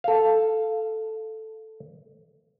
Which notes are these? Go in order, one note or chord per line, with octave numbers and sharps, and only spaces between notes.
A4 F5